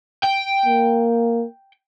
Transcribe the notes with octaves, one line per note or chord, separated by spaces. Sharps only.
G5
A#3